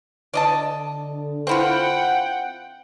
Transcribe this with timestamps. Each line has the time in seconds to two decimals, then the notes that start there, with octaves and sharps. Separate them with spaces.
0.34 D3 D5 D#5 A5
1.47 C4 E4 F4 F#5 G5